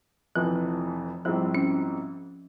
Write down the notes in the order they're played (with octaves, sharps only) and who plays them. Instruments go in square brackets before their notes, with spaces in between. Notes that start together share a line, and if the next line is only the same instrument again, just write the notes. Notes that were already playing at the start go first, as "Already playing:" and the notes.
[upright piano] F1 F2 E3 [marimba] F3
[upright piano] A#1 G#2 G3 C4 E4 [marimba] F3
[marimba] C#4